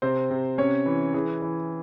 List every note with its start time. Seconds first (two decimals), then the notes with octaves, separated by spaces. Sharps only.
0.02 C3 C4 C5
0.30 C3
0.58 C3 C#4 C#5
0.86 E3
1.14 E3 G#4
1.42 E3